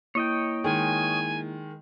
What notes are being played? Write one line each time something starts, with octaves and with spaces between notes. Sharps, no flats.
A#3 E4 C#5 D#5 G5
D#3 G#3 G#5